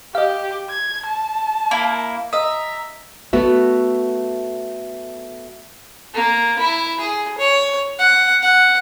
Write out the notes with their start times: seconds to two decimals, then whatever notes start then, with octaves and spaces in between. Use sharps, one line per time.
0.15 G4 D#5 F5
0.70 G#6
1.05 A5
1.71 A#3 E4
2.33 D#5 E5 A#5 D#6
3.33 A3 B3 F#4 E5
6.14 A#3
6.59 E4
7.00 G#4
7.38 C#5
7.99 F#5
8.42 F#5